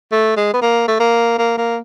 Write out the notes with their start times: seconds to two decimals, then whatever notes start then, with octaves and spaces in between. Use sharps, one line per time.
0.12 A3
0.37 G#3
0.53 B3
0.62 A#3
0.88 A3
1.00 A#3
1.38 A#3
1.57 A#3